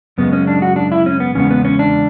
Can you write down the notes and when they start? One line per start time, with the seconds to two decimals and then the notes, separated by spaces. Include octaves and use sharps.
0.18 F#2 C#3 G#3 B3
0.33 C#4
0.47 D4
0.62 F#4
0.76 D4
0.92 E4
1.06 C#4
1.20 B3
1.35 E2 C#3 G#3 B3 C#4
1.51 B3
1.65 C#4
1.79 D4